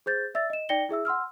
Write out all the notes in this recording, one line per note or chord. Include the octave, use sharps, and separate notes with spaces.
G#4 C5 G6 A6
D5 E5 E6 A6
D#5 E7
D#4 D5 G5 A#6 C#7 G7
E4 G#4 E5 E6
F#5 C6 E6 F6